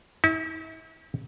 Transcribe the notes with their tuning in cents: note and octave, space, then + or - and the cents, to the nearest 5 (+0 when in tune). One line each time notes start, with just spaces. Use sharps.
E4 -40